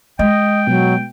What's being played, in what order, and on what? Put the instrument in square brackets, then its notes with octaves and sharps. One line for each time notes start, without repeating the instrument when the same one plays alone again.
[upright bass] G#3 [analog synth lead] D#5 [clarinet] G5
[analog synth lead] B2 [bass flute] F#3